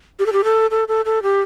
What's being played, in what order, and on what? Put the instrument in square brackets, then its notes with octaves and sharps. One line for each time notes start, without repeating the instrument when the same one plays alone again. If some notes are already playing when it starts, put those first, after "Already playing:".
[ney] G4
A4
G4
A4
A4
A4
A4
G4